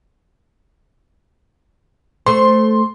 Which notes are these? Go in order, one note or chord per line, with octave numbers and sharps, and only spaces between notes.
A3 C5 C6